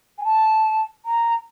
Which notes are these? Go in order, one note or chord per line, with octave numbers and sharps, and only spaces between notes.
G#5
A5
A#5